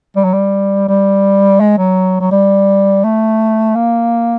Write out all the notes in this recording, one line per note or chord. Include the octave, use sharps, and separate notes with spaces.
G3
F#3
G3
G3
G#3
F#3
F#3
G3
A3
A#3